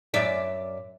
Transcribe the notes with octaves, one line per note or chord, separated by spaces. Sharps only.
F#2 D5 E5